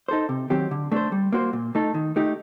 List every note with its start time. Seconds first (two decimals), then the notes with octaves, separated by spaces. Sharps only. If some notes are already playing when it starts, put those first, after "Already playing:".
0.08 D#4 A4 C5
0.29 C3
0.50 D#3 F#3 C4 G4
0.71 D3
0.92 A3 D4 A4 C5
1.12 G3
1.32 A#3 F#4 C5
1.53 A#2
1.75 A3 D#4 A4
1.95 D#3
2.16 A3 D#4 G4